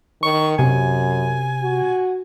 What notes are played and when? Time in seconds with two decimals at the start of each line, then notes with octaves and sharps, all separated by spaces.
0.23 D#3 C#6
0.59 F#2 C3 G#5
1.62 F#4